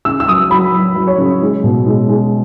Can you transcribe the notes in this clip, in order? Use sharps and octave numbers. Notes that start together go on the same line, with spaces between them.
C#3 E6
E6
F#3 D#6
F#3 B5
F#3
F#3
C#5
C#3
G#3
B2
G#3
G#3